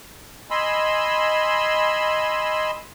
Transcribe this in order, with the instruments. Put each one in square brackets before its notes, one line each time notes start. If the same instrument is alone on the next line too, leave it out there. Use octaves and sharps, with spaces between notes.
[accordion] D#5 G#5 B5 C6 E6